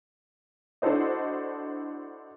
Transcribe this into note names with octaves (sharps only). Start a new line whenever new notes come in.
D4 E4 F#4 A4 C5 D#5